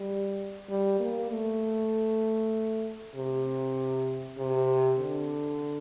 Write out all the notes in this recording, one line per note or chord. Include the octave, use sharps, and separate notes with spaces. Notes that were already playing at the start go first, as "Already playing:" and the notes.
Already playing: G3
G3
A#3
A3
C3
C3
D3